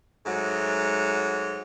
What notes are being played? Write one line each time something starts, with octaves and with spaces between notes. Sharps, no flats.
G#2 F#3 A3